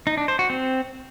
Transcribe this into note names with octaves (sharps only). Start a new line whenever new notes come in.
D#4
D4
C5
F#4
C4